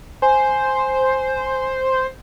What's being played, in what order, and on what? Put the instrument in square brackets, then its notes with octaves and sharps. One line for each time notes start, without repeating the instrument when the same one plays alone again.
[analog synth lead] C5 [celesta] G#5